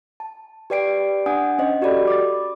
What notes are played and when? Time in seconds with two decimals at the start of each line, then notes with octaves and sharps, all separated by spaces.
0.20 A5
0.70 G4 B4 D5 G5 C7 D7
1.26 D4 F#5 G#5 D#6
1.58 C#4 C5 D#5
1.81 F#4 G4 A4 D5 B5
2.07 D6 A6